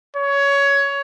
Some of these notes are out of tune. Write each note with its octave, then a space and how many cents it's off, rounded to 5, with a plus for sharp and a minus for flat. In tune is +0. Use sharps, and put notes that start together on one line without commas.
C#5 +15